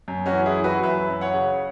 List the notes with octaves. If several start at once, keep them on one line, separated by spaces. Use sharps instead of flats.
F#2
C#4 F#4
E3
E4 G#4
E3
F#4 B4
F#2 B4 E5
F#2
C#5 F#5
C#3